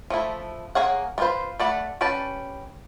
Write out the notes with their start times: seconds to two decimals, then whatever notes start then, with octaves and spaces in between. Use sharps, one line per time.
0.10 F3 A3 E4
0.75 A#3 G#4 C#5 F#5
1.18 B3 D4 F4 B4 C5
1.59 A3 D5 F#5 B5
2.01 C#4 G4 B4 D5 A5